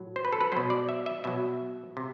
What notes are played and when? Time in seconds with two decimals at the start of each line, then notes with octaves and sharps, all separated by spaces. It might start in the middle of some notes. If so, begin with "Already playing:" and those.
Already playing: A2 F#3
0.16 C5
0.25 B4
0.33 A4
0.41 B4
0.52 B2 F#3 C5
0.70 D5
0.89 E5
1.06 E5
1.24 B2 F#3 E5
1.97 C3